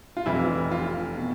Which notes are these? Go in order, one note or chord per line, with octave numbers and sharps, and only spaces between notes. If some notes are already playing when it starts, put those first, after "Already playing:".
F4
F1 F2 E3 E4
F4
B2